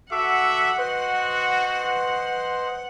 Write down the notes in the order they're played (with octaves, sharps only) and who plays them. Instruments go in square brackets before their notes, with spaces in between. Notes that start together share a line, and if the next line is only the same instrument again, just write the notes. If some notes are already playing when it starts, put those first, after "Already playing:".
[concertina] F#4 A4 D6 [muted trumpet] E5 [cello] F#5
[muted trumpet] F#4 [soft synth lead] B4 [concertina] C5 D#5 C6